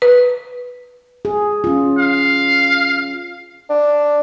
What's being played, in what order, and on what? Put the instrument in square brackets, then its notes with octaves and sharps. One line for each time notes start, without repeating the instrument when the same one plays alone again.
[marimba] B4
[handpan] G#4
C#4 F4
[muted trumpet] F5
[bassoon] D4